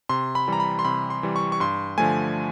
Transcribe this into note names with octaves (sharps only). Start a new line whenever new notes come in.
C3 C6
B5
E3 G3 A#5
B5
C6
C3 B5
C6
E3 G3
C#6
C#6
G2 C6
D3 F3 A3 G#5